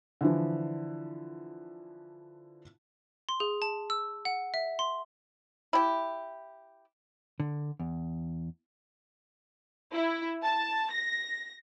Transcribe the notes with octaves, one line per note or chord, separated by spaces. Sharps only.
D3 E3 F3
C6
G#4
A5
E6
F#5
E5
C6
E4 G4
D3
E2
E4
A5
A#6